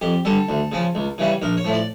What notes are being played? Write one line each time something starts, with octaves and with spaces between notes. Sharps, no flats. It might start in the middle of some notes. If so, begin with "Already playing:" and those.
F2 G4
D3 G3 A4
D2
C#3 F3 C#4
C#2
C#3 E3 G3 C#4
A#1 A#4
C#5
A2 F3
D5